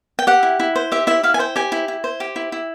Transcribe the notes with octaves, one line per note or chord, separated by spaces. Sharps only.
G5
G4 F#5
E4
E4
C5
G4 E5
E4 E5
E4 F5
G#5
C5 G5
G4 G#5
E4
E4
C5
G4
E4
E4